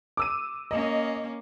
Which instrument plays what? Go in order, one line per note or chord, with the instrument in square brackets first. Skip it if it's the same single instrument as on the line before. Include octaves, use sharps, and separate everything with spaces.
[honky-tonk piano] D6 E6 D#7
[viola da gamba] A#3 C#4 [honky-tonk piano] D#5